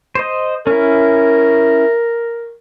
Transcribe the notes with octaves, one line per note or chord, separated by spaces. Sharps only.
C5 D#5
C#4 E4 A#4